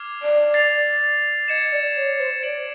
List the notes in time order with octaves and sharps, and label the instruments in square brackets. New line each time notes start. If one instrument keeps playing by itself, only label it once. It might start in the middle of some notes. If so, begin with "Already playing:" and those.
Already playing: [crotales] D6 F6 G#6 C7 F7
[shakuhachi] D5
[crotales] A6 C7 F7
[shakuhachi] D#5 [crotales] G#6 C#7 E7
[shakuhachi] D5
C#5
C5
[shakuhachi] D5 [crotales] A6 D7 F#7